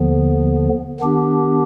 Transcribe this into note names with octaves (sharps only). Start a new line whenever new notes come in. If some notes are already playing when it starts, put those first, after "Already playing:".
Already playing: D#2 D3 F3 B3
D#3 B3 D4 G4